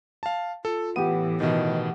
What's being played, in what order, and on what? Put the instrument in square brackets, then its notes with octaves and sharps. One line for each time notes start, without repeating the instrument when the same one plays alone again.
[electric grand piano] F5 A5
[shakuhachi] F4 [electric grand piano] A4
[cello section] A2 E3 [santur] B3 G4 [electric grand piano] D#7
[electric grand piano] B2 D#3 [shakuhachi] D#5